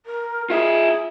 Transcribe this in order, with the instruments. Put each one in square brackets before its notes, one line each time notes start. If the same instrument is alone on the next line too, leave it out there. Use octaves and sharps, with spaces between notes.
[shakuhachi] A#4
[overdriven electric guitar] F4 E5 [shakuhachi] G#4